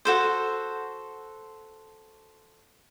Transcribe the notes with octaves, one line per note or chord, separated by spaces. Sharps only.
F#4 A4 C5